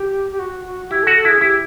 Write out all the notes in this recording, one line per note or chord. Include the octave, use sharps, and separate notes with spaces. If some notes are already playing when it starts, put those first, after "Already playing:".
Already playing: G4
G4
F#4
F#4
F#4
E4 G4
F#4 A4
A4
E4 G#4
E4 G4